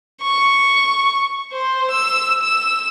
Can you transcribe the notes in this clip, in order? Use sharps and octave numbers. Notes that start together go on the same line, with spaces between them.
C#6
C5
E6
E6